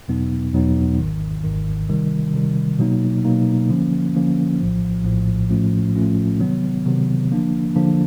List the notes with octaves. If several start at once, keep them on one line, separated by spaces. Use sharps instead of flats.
E2 B2 F#3 B3 D#4
E2 B2 F#3 B3 D#4
G#1 G#2 D#3
G#1 G#2 D#3
C3 D#3 G3
C3 D#3 G3
B2 F#3 A#3 D#4
B2 F#3 A#3 D#4
D3 F3 A#3 C#4
D3 F3 A#3 C#4
A#1 A2 F3
A#1 A2 F3
A2 F3 A3 C#4 F4
A2 F3 A3 C#4 F4
C3 D#3 F#3 B3
C3 D#3 F#3 B3
D3 F3 A#3 D4
D3 F3 A#3 D4